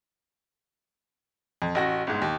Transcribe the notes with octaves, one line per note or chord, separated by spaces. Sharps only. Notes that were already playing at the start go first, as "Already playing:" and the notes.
F2
A1 F#4 A#6
G1 G#2
D#2